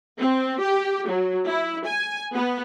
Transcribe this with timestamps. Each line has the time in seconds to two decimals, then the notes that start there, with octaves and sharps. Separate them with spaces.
0.18 C4
0.60 G4
1.07 F#3
1.47 E4
1.87 G#5
2.34 B3